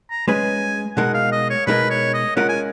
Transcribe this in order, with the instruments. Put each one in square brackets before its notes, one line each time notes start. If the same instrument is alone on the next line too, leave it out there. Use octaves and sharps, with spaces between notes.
[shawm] A#5
[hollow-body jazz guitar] G#3 C#4 G#4 B4 [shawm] G#5
[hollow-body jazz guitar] B2 G#3 D#4 A#4 [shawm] F#5
[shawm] F5
D#5
C#5
[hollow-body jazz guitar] B2 G#3 D#4 A#4 [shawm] B4
[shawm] C#5
D#5
[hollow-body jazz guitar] G#3 C#4 F4 A#4 [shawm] F#5
[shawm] G#5